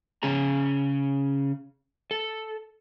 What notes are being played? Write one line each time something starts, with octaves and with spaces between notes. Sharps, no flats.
C#3 C#4 G#4 A#5
A4